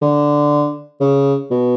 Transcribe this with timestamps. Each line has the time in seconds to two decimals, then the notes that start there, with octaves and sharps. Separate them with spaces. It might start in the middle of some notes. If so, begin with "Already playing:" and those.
0.02 D3
1.00 C#3
1.51 B2